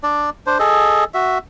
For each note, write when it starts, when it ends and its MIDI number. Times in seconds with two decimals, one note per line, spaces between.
0.03 0.30 62
0.03 0.30 74
0.47 0.58 62
0.47 0.58 72
0.59 1.04 68
0.59 1.04 69
0.59 1.04 75
1.14 1.38 66
1.14 1.38 76